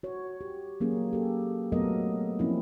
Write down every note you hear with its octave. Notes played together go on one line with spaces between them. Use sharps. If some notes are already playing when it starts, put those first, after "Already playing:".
F#4 C#5
G4
F#3 A#3 C#4 G#4
G4 A4
F#3 A3 B3 A4 A#4 D#5
F3 A3 A#3 C4 C#4 E4